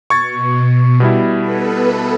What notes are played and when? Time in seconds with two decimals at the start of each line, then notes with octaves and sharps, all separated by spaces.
0.10 B2 C#6 G#6 A6
1.00 B2 G3 E4
1.39 B3 A4 B4